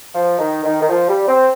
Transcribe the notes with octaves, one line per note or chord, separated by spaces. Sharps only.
F3
D#3
D#3
D#3
F3
G3
C4